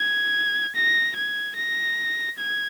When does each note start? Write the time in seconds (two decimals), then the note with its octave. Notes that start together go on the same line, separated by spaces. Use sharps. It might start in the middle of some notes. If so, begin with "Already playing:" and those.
Already playing: G#6
0.75 A#6
1.16 G#6
1.56 A#6
2.38 G#6